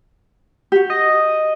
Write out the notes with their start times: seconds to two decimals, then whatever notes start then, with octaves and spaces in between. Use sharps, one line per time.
0.72 F#4 G4
0.90 D#5